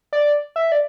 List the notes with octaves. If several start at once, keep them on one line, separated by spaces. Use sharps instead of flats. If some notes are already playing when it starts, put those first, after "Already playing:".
D5
E5
D5